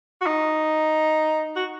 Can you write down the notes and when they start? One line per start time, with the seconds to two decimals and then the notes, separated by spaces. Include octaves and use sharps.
0.21 F#4
0.27 D#4
1.56 F#4